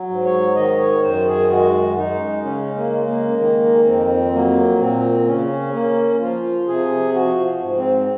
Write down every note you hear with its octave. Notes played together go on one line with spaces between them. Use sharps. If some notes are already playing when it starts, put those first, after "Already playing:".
Already playing: F#3
G#2
C#5
D#3 D#5
C#5
F#2 C5
G#4
G#3 F#4
G#3 D#4
C#3 C#4
A#3
G#3
A#3
D#3 A#3
F2 C4
F#3 A#3
A#2 C4
C4
C#3 C#4
A#3
F3 F4
C3 G#4
F3 F#4
G#2
C4